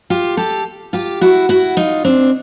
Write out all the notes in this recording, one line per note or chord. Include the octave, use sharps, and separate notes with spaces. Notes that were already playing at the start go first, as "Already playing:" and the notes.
F4 G4
G4 A4
F4 G4
E4 F#4
E4 F#4
D#4 F4
C4 D4